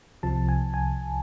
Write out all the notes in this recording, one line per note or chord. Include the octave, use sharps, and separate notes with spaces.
C2 C3 F3 A5
G#5
G#5